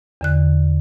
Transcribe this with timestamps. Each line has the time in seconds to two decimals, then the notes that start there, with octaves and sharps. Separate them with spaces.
0.21 E2 D3 F#6